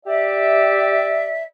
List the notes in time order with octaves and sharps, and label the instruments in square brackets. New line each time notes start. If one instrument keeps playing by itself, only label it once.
[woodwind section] G4 D5 E5